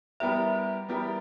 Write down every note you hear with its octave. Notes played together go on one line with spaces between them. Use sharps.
G3 B3 E4 G4 A#4 E5
G3 B3 E4 G4 A#4